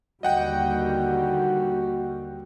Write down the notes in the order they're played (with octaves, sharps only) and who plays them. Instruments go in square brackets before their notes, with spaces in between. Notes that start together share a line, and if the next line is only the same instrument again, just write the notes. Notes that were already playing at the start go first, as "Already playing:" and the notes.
[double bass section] D#2 D3 G3 [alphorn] F#4 [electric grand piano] D#5 F#5 G5